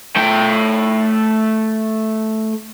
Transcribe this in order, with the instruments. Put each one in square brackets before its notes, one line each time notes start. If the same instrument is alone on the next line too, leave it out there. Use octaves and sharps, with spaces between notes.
[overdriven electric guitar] A3 G5